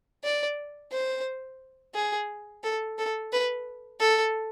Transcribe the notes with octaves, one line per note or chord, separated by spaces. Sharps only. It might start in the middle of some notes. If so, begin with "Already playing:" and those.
D5
C5
G#4
A4
A4
B4
A4